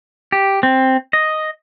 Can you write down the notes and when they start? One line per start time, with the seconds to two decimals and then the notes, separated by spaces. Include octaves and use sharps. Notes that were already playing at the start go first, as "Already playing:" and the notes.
0.32 G4
0.63 C4
1.13 D#5